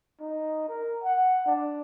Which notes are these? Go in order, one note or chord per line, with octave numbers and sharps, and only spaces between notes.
D#4
A#4
F#5
D4